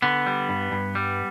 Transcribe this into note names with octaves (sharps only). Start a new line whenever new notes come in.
D3 B3
G3
G2
G2
G3